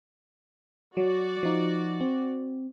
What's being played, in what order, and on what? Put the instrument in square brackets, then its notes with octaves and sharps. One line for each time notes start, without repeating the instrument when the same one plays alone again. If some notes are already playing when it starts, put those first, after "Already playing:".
[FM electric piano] F#3 [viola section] F#4 D5
[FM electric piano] F3 D#4
C4